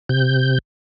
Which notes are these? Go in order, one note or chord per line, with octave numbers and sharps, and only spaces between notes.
C3 G6